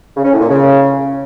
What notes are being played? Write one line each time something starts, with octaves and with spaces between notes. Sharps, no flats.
C#3
C#4
A2
A#2
C#3